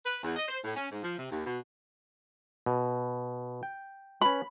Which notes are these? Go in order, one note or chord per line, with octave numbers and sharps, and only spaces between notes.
B4
E2
D#5
C5
A2
C#4
G#2
F3
C3
D#2
B2
B2
G5
C#4 B4 B5